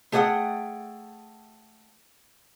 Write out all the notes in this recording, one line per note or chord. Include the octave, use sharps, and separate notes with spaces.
A3 G#4 C5 D5 F#5 G5